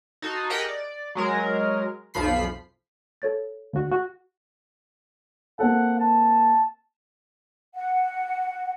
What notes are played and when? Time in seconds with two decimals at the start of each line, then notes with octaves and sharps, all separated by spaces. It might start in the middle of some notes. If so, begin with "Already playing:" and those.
0.22 D#4 F#4 A4 C6
0.50 G4 G#4 A#4 D#5 F#5 G5
0.68 D5
1.15 F#3 G#3 A#4
2.14 B1 F2 F3 B5 B6 C7
3.22 A4 C#5 A6
3.73 D2 F#4
3.92 F#4
5.59 A#3 C4 A4 F#5
5.99 A5
7.75 F#5